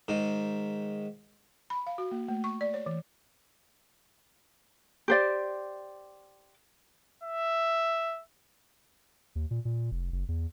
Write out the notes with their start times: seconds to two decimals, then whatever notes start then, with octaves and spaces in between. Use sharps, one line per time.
0.08 G#2 D#3
1.70 B5
1.87 F5
1.98 F#4
2.11 A#3
2.28 A3
2.44 C#6
2.61 D5
2.74 C#5
2.86 E3
5.08 G4 C5 D5
7.23 E5
9.35 D#2
9.51 A#2
9.65 A#2
9.91 F1
10.12 F#1
10.28 E2